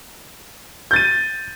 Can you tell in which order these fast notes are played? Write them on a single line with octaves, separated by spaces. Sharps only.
G6 A6 D#7